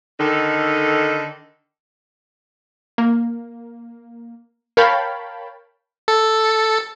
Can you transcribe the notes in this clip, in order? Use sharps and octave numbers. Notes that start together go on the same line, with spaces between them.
D3 D#3 D#4 A4
A#3
A#4 C#5 F5 G5 A5 B5
A4